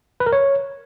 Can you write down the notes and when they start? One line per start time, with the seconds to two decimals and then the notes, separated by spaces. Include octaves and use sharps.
0.20 B4
0.26 A#4
0.33 C#5